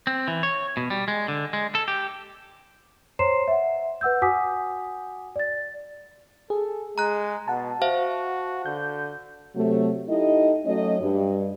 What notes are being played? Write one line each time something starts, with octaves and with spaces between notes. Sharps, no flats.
C4
E3
C#5
B2
G3
G#3
D3
G#3
A4
G4
C5 C#5 A#5 C6 C7 E7
E5 F#5
B4 F#5 E6 G6
F#4 F#5 G#5 D6 D#6 B6
D5 A6
G#4 A4
G#3 A#5 F#6
B2 F#5 A5
F#4 C5 E5 F5
D3 G6
C3 F#3 A3
D#4 E4 G4 A4 D#5
F#3 A3 C#4 D#5
G2